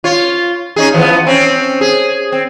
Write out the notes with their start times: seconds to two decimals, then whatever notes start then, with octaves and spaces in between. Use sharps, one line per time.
0.04 F4 C#5
0.76 C#4 D#4 G#4
0.94 E3 F3 B3
1.26 C4 C#4
1.81 G#4
2.32 C4